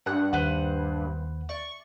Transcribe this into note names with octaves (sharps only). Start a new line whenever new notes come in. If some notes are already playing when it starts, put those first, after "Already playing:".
G2 F#5 F#6
D#2 B4 C5 F#5
D5 C#6